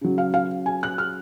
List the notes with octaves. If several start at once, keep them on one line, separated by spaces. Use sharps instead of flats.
C#3 F#3
F5
F5
G#5
F#6
F6